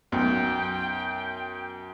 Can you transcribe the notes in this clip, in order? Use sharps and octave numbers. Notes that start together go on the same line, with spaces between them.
B1 F#2 G5